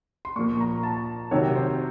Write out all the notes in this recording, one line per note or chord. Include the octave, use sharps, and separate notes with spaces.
C6
A#2 F3 A#3 C#6
A#5
A5
C3 D#3 F#3 C#5
C5